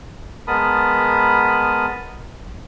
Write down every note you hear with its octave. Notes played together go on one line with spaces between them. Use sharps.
G#3 B3 A#4 A5 B5 D#6